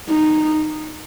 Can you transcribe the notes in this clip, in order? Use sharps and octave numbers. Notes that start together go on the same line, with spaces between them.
D#4